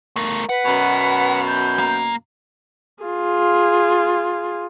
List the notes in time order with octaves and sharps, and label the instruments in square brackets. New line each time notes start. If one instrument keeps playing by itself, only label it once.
[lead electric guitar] A3 A#4
[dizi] B4 [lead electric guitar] F#5
[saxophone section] F#2 B2
[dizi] G6
[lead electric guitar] A#3
[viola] F4 G#4